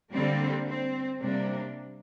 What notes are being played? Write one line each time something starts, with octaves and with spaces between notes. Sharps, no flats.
D3 G3 A#3 C4
C4
C3 G3 A#3 D4